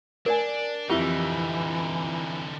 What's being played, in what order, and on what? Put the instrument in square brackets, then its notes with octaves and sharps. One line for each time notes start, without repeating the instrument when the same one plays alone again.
[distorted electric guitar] D4 [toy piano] A#4 D5 G#5
[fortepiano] F2 E4 [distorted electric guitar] D3 D#4 [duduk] E3 [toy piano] G4